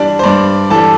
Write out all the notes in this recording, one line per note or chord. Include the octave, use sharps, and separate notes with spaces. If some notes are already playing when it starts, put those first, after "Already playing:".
Already playing: G2 E3 G3 D4 D5
C5
G2 D4 D5
E3 G3 A4 A5